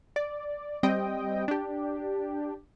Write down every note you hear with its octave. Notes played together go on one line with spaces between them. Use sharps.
D5
G3 C4 D#5 G5
D4 G4